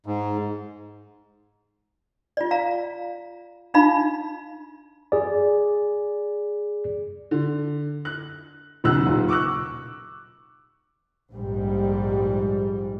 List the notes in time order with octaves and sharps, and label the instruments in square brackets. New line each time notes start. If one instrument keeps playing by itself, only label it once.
[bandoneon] G#2
[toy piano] F4 D5
F5 A#5
D4 D#4 F4 F5 B5
[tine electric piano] G#4 D5
[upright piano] D3
F#6
E1 B1 C#3 E6 F#6
D#1 B1 F4
C#6 D6 E6 F#6
[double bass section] A#1 G#2 G3